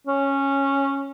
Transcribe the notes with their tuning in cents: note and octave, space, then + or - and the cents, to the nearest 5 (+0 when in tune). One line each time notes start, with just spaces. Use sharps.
C#4 -10